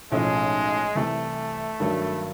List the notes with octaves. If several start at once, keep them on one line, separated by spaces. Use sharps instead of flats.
B1 A2 F3 G#3 A3 C#4
C2 C3 E3 A3
G2 D#3 F#3